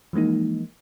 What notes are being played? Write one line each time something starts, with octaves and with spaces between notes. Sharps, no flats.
E3 F3 G#3 A#3 D#4